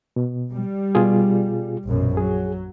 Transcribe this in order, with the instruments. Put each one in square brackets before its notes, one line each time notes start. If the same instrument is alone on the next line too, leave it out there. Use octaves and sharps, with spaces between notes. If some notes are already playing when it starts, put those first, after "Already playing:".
[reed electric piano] B2
[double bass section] G3
[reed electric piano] B2 F4 G#4
[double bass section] A#1 F#2 B2
[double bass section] F#3 [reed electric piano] G#4